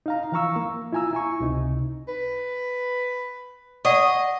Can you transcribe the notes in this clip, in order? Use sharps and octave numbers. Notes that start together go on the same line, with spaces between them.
D#4 F5 A#5
E3 F3 F5 A#5 C#6 E6
A#3
E4 F4 G#5 A#5 E6
E4 G#5 C#6
C#2 C3 D#4
B4
D5 D#5 F#5 C#6